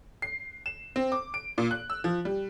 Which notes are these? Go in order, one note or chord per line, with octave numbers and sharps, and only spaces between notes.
C7
E7
C4
D6
D7
A#2
F#6
E6
F3
G3